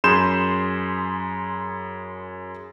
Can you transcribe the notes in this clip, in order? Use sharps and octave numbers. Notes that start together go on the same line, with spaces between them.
F#2 G#4 B5 C6 G6 E7